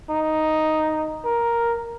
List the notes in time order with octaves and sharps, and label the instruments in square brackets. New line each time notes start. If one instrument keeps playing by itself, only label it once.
[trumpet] D#4
A#4